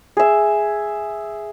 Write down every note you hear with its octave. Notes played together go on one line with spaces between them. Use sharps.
G#4 E5